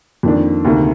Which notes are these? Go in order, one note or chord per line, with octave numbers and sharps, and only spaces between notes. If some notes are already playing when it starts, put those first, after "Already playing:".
F2 D#3 A#3 D4
D2 C3 D#3 A#3